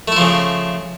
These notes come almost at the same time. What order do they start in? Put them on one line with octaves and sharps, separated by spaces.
A3 E4 F3 C#3